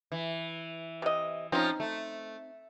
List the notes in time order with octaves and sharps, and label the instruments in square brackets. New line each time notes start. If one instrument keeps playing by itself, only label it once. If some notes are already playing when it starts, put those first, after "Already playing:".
[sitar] E3
[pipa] C3 D#5
[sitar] F3 C#4 F4 [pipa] C4 D#4
[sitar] A3